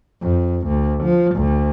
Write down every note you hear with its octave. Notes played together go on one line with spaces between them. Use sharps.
F2
D2
F3
D2